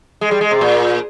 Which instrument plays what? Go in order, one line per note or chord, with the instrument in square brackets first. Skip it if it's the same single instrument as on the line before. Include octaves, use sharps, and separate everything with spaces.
[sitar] G#3
G3
G#3
C3
A#2